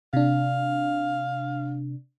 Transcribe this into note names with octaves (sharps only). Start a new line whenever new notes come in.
C3 D4 F5